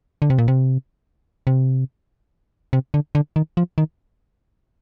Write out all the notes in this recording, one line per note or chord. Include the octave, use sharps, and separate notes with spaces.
D3
C3
A#2
C3
C3
C3
D3
D3
D#3
F3
D#3